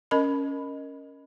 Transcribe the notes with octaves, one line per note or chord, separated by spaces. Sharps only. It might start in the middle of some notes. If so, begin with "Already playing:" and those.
C#4 A#4 D#5 B5